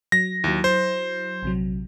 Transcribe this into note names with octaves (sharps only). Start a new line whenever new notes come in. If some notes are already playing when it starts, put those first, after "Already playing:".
F#3 A#6
D#2 F#3 E4
C5
A#1 C3 F#3